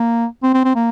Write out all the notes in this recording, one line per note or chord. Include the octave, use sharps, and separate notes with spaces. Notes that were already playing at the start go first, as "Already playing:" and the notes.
Already playing: A#3
C4
C4
C4
A#3